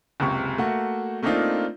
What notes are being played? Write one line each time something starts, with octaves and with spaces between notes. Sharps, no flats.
F#1 C#2 C3 C#6
A3 A#3 F#4
A3 A#3 C4 D4 D#4 F4